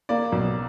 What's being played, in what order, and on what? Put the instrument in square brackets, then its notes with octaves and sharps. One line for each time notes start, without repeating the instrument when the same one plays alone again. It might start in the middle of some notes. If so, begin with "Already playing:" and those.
[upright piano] A#3 D5
B1